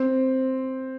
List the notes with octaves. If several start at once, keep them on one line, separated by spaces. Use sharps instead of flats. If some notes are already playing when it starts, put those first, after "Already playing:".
Already playing: C4